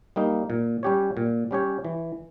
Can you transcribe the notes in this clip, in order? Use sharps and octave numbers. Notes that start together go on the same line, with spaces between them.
G3 A#3 D#4
A#2
G3 C#4 G4 C#5
A#2
G3 C#4 G4 C#5
E3